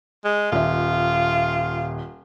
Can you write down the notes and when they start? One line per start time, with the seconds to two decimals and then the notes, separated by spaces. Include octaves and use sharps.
0.25 G#3
0.52 D#1 F4 E5